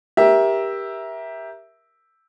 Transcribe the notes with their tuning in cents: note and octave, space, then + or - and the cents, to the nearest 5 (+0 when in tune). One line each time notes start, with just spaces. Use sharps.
G4 +5 A#4 +20 E5 -5